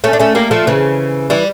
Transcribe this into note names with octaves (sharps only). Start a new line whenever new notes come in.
A3 C#4
D4
A3 C#4
G3 A#3
F3 A3
C#3 E3
E3 G3